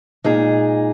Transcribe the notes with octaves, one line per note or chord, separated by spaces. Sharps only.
A#2 G#3 D#4 G#4